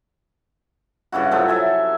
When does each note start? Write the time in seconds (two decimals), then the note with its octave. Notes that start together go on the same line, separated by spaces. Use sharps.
1.12 G2 C#3 E4 F#4
1.31 C3 F3 F#3 A3
1.48 A4 E5 G#5